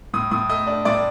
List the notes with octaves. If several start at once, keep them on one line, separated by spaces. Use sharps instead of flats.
A2 D#6
A2 D#6
A3 D#5 D#6
D4
A2 D5 D6